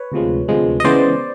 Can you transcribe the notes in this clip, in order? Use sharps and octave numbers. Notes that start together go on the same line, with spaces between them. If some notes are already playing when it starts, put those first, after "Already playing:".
Already playing: B4 C#5
D2 C3 F3 G#3
D2 C3 F3 G#3
D#5
C#3 E3 G#3 B3 C5 D5